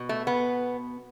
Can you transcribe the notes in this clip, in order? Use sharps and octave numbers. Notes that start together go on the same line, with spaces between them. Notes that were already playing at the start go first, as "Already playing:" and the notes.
Already playing: B2
A3
B3